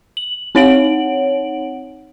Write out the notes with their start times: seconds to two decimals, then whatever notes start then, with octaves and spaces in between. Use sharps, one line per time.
0.17 F#7
0.55 C4 D#4 C#5 F#5 D7 F#7